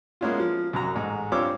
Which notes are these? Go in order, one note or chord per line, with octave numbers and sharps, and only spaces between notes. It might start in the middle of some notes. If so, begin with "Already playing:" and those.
G#3 A#3 B3 C#4 E4 F4
F3
C2 F#2 F#4 A#5
A1 G#2
G2 C4 F4 C#5 D6 E6